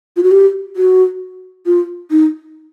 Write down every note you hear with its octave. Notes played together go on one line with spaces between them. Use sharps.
F4
F#4
G4
F#4
F4
D#4